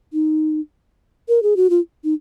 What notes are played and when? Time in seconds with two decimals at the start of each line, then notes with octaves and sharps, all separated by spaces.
0.13 D#4
1.29 A#4
1.43 G#4
1.57 F#4
1.70 F4
2.04 D#4